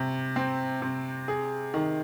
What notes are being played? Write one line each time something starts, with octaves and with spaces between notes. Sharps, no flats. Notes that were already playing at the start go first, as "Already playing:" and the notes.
Already playing: C3
C4
C3
G#4
D#3